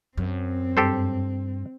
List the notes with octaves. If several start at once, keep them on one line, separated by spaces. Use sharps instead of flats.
F#2 C4
G2 G4 A4 C5